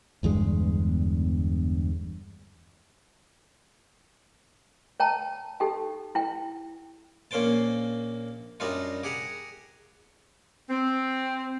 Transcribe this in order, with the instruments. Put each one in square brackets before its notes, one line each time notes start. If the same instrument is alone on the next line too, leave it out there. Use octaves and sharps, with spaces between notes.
[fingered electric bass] G1 E2 G2 G#3
[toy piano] C#5 G5 A5 A#5
D#4 G4 A4 G5
E4 G5
[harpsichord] A#1 A#3 C#4 C5 G5 A5
F#2 G3 D4 D#4 F4
G4 G#4 F#5 A#5
[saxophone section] C4